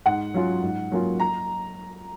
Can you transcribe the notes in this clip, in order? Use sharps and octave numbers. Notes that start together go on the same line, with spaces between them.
G#2 F#5
F#3 C#4 F4
G#2
F#3 A#3 C#4 F4
A#5